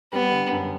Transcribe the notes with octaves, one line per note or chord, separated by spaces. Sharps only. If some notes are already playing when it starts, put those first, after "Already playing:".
G3 B3
D3
F#2